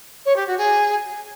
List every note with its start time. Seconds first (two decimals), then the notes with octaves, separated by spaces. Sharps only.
0.25 C#5
0.36 G4
0.46 F#4
0.57 G#4